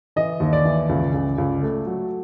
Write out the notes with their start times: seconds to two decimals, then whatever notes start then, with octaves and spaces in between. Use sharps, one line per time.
0.16 E3 D#5
0.40 D#2
0.53 D5
0.65 E3
0.89 C#2
1.14 C#2
1.38 C#2
1.62 A3
1.86 F#3